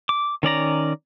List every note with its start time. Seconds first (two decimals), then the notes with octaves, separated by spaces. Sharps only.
0.09 D6
0.43 D#3 C#4 D5 A#5